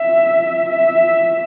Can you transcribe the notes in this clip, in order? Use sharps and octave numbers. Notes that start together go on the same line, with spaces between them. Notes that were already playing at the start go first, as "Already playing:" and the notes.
Already playing: E5
E5